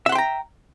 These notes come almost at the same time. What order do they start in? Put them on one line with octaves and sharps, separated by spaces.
E5 F#5 C6 G5 A#5